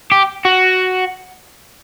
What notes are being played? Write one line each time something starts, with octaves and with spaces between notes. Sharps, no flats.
G4
F#4